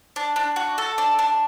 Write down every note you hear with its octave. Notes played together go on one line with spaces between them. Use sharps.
D4
D4
F#4
A4
D4
D4